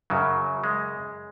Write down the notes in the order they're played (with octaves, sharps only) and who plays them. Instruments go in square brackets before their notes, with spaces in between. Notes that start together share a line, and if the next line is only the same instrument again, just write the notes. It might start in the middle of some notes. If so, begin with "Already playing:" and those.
[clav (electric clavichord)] F#2 C#3 F#3
G#3